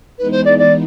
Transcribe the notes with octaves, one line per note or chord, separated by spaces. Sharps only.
E3 G#3 B3 D#4 B4
C5
D5
D5